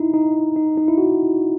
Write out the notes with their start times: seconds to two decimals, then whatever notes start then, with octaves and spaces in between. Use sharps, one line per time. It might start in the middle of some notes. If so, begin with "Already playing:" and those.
Already playing: D#4 E4
0.14 D#4
0.56 D#4
0.77 D#4
0.88 E4
0.98 F#4